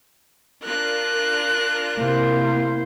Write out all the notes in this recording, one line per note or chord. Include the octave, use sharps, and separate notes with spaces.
D4 F4 A#4 F#6
C3 A#3 E4 C5